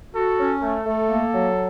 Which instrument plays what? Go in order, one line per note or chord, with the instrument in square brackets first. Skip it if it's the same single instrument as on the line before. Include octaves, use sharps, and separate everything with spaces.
[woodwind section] F#4 [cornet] A4
[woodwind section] C#4
[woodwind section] A3 [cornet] A4
[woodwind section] A3
A#3
F#3